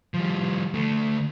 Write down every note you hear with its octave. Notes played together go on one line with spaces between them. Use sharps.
F3 G3
D2 A3